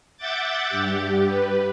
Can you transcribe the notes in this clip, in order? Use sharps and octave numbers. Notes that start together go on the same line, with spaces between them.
E5 F#5 D6 G6 A6
G2 G4
B4